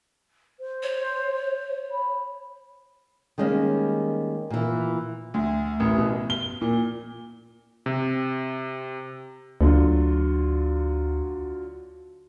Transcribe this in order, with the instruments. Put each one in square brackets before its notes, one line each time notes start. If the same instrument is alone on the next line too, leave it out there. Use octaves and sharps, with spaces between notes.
[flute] C5
[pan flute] C#5
[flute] B5
[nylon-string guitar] D#3 G3 G#3 A#3 C#4
A#2 E3
[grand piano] D2
A1
B2
G7
A#2
[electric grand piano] C3
[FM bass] D2 [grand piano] D3 F#3 F4